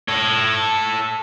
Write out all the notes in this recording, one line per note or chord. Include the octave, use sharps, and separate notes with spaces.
A4 C#5